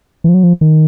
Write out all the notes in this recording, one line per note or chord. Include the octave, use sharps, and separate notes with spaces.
E3
F3
F#3
F3
D#3